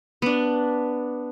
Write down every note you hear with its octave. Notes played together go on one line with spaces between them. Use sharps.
B3 D4